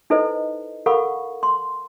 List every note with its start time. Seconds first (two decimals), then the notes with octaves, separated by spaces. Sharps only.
0.10 D#4 E4 A4 B4 C5 D#5
0.86 A4 A#4 F5 F#5 B5 C#6
1.43 C6